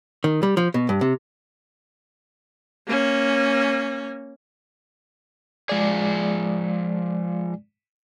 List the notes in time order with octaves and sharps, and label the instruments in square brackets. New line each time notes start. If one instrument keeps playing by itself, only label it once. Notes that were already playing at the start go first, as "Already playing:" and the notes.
[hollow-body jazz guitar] D#3
G3
F3
B2
G2
C3
[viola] A#3 C#4
[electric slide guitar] F3 G#4 [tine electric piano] G#3 D5